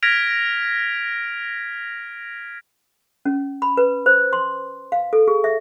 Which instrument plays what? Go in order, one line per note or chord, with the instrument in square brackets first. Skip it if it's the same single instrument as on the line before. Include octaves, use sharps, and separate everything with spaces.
[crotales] F6 G#6 A#6 B6 D7 F7
[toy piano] C#4
B5
B4
C5
C6
F5
A4
G#4
E5